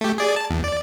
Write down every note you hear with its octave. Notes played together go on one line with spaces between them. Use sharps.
A3 G4
G#4 D5
A5
E2
D5